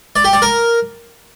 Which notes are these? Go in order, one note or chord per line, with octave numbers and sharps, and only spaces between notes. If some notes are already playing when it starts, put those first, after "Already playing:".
D5
G4
D5
A#4